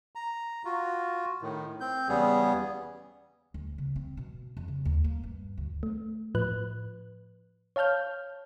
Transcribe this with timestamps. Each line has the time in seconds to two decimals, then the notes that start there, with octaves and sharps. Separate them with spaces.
0.15 A#5
0.65 F4 F#4
1.42 A2 D#3
1.81 C4 G6
2.09 E2 C#3 G3 B3 G#4
3.54 D2
3.78 C#3
3.96 C4
4.17 B2
4.57 F2
4.68 C#3
4.85 D#2
5.04 A#3
5.23 G2
5.57 D2
5.83 A3
6.35 A2 F3 B4 F#6
7.76 C#5 F5 A5 F6 G6